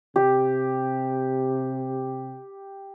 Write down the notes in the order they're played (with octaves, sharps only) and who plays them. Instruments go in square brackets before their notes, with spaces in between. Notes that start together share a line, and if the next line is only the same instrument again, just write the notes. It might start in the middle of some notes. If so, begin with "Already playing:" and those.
[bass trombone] C3 [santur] G4